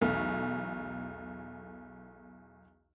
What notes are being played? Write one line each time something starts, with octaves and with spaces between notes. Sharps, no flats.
B1 E2 A3